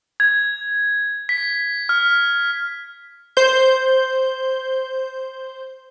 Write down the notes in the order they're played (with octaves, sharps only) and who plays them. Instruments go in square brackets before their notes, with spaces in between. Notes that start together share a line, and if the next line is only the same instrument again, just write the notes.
[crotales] G#6
B6
F6
[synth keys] C5 G6